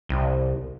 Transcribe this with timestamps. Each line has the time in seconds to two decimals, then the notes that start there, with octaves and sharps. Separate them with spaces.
0.09 C2